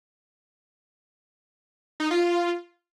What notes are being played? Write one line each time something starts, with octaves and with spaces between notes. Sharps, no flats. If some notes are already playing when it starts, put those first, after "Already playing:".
D#4
F4
F4